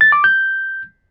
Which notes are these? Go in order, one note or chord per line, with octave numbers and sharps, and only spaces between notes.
A6
D6
G6